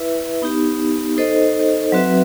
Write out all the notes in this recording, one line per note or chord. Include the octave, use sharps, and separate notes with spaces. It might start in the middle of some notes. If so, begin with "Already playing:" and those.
Already playing: E4 B4 E5
B3 D#4 G4
D#4 A4 C5 D#5
F#3 C4 F#4 B4 E5